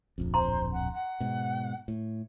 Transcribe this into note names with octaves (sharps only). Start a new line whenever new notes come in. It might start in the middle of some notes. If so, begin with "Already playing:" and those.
D1 A#1 F2
C5 A#5 C6
F#5
F#5
G#2 B2
A2